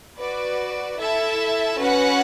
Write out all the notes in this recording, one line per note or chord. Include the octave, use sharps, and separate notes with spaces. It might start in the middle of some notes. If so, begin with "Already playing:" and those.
F#4 B4 D5
E4 A4 E5 A5
C#4 F#4 B4 F#5